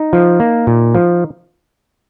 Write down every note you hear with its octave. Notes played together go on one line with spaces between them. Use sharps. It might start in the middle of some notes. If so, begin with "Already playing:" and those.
Already playing: D#4
F3
A#3
A#2
F3